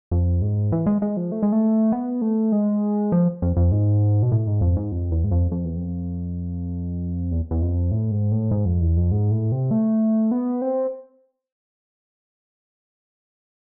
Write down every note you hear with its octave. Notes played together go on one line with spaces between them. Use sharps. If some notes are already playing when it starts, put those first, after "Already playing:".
F2
G#2
E3
G#3
G#3
F3
A3
G#3
A3
B3
A3
G#3
F3
F2
F2
G#2
B2
A2
G#2
F2
G#2
F2
E2
G#2
F2
F2
E2
F2
E2
E2
F2
A2
G#2
A2
G#2
F2
E2
F2
G#2
A2
C3
A3
B3
C4